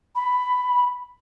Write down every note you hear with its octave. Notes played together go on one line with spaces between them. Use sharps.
B5